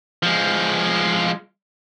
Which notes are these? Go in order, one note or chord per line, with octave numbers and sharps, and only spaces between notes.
F3 G#3